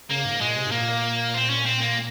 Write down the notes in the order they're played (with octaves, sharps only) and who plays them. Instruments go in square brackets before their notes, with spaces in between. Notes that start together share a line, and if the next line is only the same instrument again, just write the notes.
[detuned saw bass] C#3 [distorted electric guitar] A#3
[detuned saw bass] G#2
[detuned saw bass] A#2 [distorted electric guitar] G#3
[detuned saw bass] C3
G#2
[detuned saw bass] A#2 [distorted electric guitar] A#3
[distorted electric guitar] C4
C#4
C4
A#3